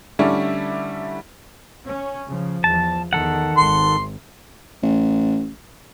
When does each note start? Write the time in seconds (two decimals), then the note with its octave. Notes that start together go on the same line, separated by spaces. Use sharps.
0.19 D3 G3 A3 C#4 D4 E4
1.86 C#4
2.29 C#3 F3
2.64 E2 F3 A5
3.13 E2 D#3 A4 F#5
3.58 G#1 C6
4.83 A1